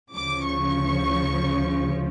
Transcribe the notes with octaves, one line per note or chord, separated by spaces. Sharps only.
D2 C#3 F3 D6
C#6